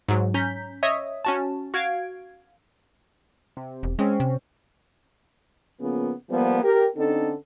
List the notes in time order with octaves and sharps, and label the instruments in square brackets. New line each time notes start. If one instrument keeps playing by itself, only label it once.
[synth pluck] G#2 F#3
C#4 A#5 G6 B6
C#5 D#5 E5 D#6
C#4 F#4 A5
F#4 F5 G#6 D7
[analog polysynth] C3
[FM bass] E1
[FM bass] G#3 [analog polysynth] C4 C#4
[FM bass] C3
[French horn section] C#3 F3 A#3 B3
F3 G3 A#3 B3
G4 A#4
D3 C4 C#4 D#4 A4